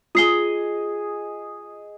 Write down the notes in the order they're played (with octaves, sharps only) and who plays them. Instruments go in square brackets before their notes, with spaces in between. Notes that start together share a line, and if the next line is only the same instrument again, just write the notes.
[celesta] F4 C7 G7 [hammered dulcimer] G#4 D#5